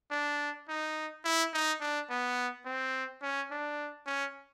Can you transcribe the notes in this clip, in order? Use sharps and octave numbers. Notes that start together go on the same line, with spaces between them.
D4
D#4
E4
D#4
D4
B3
C4
C#4
D4
C#4